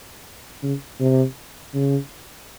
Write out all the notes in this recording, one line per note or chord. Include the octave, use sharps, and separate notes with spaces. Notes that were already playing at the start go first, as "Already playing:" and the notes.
C#3
C3
C#3